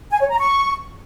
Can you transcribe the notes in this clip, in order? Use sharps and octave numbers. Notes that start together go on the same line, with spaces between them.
G#5
C#5
A#5
C#6